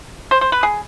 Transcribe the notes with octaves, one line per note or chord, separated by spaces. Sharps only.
C5
C5
B4
G#4